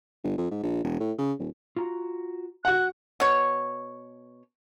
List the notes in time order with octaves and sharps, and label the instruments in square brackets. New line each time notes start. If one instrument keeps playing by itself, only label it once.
[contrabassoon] G1
F2
G#2
A#1
E1
A2
C#3
D#1
[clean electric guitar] F4 F#4 A#5
[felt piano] F#4 F#5 [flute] F#6
[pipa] B2 C#5